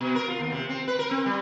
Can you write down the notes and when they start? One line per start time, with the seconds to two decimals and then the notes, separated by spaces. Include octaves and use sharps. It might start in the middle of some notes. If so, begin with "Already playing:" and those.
0.01 B2
0.15 A#4
0.28 F4
0.40 D#2
0.52 C3
0.69 C4
0.88 B4
0.99 A#4
1.11 C4
1.26 G3